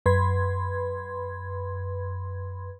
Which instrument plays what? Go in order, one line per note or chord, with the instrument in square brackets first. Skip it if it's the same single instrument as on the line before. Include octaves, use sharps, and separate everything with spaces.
[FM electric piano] F#2 B4 B5 C6 G#6